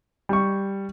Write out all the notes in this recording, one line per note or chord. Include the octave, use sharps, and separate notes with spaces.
G3 C#6